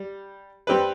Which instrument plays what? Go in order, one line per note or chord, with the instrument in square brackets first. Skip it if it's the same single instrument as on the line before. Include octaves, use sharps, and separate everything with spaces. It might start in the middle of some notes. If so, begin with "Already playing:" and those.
Already playing: [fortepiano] G3
G3 C4 G4 B4